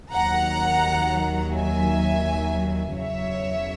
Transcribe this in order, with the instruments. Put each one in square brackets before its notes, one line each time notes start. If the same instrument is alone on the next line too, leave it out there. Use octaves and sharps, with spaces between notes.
[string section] D#2 D#3 F#3 F#5 A#5
E5 G#5
E2 C#3 F#3 C#5 E5